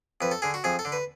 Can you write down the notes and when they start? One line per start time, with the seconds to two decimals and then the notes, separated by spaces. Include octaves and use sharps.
0.21 F2 B4
0.31 A4
0.42 D3 G#4
0.54 F#4
0.64 F2 G#4
0.79 A4
0.85 D3
0.92 B4